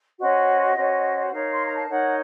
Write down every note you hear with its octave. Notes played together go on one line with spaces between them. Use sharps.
C#4 F#4 C5 D#5
C#4 F#4 C5
F#5
D#4 A#4 C#5 F5
C6
A#5
A5
D#4 A#4 C#5 F#5